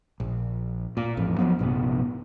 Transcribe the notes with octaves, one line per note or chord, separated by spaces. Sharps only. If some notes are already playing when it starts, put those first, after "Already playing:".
A#1
A#2
A1 F2
F3 F#3 A3 B3
A#1 G2 C3 B3